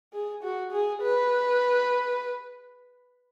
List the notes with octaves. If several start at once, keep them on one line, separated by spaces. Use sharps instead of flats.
G#4
F#4
G#4
B4